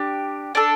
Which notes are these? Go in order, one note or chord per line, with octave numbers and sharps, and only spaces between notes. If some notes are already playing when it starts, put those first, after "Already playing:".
Already playing: D4 G4
D4 A4